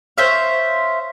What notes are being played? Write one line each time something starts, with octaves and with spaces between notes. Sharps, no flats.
C5 C#5 E5 F5